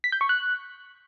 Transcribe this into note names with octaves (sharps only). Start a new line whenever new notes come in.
B6
G6
C#6
F#6